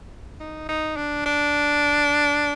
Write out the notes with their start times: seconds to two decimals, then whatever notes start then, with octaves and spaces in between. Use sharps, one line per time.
0.40 D#4
0.69 D#4
0.97 D4
1.26 D4